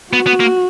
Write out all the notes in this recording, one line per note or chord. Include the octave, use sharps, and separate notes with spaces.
B3 F#4
B3
A#3